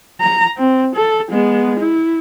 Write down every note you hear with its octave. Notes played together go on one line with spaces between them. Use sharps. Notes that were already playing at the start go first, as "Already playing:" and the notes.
A#5
C4
A4
G#3 B3
E4